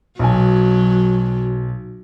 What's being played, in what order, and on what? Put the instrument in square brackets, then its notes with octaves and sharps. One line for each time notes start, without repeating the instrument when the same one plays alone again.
[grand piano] B1 G#5 [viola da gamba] F#3